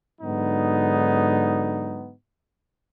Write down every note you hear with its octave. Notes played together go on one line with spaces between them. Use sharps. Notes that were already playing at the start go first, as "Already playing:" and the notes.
G#2 D3 F#3 B3 D#4